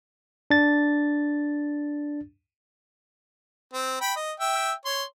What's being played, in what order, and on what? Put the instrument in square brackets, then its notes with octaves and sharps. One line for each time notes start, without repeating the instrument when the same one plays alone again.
[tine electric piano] D4 A6
[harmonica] C4
G5 B5
D#5
E5 G5
C#5 C6